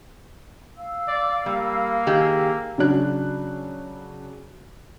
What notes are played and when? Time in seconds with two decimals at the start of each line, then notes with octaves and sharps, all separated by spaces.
0.78 F5 E6
1.08 D5
1.46 G3 A#3
2.07 D#3 G4 G#4
2.78 C#3 F#3 D4 F#6